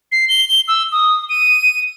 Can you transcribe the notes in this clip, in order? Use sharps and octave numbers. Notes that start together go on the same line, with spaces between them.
C7
G7
G7
E6
D#6
D#7